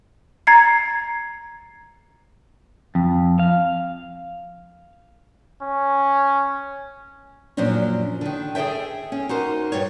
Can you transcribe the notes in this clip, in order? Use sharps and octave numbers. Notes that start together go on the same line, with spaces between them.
A#5 G#6 A6 C7 C#7
F2
F5
C#4
F#2 A#2 F3 F#3 C#4 D4
D3 D#3
G#4 A4 D5 E5 G5
C#4
D#4 F#4 A#4 C5
G2 C#5